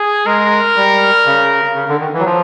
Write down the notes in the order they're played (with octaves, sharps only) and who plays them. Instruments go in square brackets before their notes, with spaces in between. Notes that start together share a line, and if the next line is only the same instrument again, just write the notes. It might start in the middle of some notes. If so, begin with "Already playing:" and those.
Already playing: [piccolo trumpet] G#4
[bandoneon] G#3 [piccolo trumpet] A#4
[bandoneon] G3
C#3
C#3
D3
D#3
E3
F#3
F3